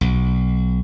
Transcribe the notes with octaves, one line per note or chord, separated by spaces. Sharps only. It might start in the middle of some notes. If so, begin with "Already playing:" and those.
B1